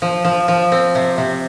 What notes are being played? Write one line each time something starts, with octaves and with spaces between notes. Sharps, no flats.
F3
F3
F3
C4
C3
C3